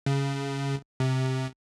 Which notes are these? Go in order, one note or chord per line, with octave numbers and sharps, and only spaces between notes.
C#3
C3